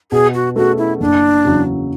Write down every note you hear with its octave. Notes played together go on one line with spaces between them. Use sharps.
B2 G#4
F#4
A3 C#4 F#4 G#4
E4
F#1 D4
E2 C#3 F#3